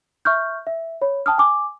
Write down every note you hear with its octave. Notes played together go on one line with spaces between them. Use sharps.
E5 C#6 F6 G6
E5
C#5 B5
G5 A5 D#6 F6
G#5 D6